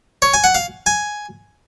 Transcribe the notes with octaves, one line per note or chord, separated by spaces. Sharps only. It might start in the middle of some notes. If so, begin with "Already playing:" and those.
C#5
G#5
F#5
F5
G#5